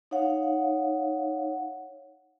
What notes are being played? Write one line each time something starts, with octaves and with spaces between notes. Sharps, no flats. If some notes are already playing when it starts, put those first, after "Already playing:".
D#4 C#5 F5 F#5